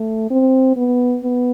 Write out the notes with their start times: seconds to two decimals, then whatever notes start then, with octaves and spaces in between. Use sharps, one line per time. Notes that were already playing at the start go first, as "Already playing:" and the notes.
Already playing: A3
0.30 C4
0.76 B3
1.23 B3